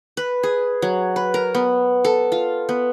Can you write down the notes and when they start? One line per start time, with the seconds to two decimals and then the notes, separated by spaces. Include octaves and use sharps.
0.17 B4
0.43 G#4
0.82 F#3
1.16 B4
1.34 A#4
1.55 B3
2.05 A4
2.32 F4
2.69 B3